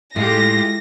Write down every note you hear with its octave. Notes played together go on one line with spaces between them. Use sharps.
A2 G#3 F4 G4 A#6